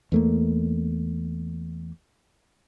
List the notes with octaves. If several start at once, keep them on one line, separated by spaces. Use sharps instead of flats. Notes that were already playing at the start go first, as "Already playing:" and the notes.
E2 A3 A#3